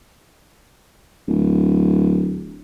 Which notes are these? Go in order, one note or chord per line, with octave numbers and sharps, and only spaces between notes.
D1